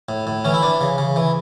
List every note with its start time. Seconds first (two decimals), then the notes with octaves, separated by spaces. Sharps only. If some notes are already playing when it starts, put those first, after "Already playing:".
0.09 A2
0.27 A2
0.44 E3 C#4
0.54 E4
0.62 E3 D4
0.81 C#3
0.98 C#3
1.16 E3